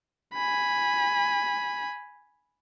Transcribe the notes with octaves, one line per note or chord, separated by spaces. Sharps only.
G#5 B5